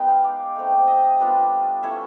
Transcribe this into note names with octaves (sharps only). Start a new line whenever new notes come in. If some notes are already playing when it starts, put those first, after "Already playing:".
Already playing: G#3 B3 D#4 G5
F5
D5
A3 C4 D#4
D#5
G3 B3 D4 F4
A3 C#4 E4 E5